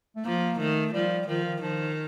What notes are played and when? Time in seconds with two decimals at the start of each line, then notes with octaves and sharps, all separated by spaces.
0.16 A3
0.25 F3 A#3
0.59 D#3 A3
0.93 F3 G3
1.28 D#3 F3
1.44 D#3
1.62 D#3 F3